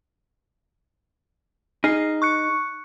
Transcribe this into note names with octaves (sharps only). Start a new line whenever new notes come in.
D#4 G#4 F6 C7
C#6 F#6 C#7